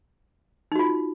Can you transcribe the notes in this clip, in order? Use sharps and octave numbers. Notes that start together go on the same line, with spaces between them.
D#4 F4 F#4